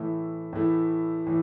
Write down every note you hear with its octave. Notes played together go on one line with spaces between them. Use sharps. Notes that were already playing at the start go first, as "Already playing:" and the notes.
Already playing: A2 E3 A3 E4
A2 E3 A3 E4
A2 E3